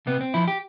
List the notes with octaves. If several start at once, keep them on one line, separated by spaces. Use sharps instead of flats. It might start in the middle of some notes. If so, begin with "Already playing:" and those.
C3 B3
C4
F3 E4
G4